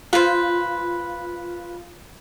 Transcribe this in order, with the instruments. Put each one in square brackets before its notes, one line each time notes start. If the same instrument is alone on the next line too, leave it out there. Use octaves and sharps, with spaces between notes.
[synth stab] F4 [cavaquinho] B4 C5